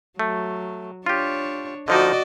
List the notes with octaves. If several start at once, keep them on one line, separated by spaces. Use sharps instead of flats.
F#3 A3
D4 F4 G4 C#5
D3 F3 D#4 F#4 D5 D#5